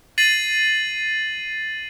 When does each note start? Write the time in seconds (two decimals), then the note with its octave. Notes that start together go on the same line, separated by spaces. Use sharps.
0.18 A6 C7 D#7 F#7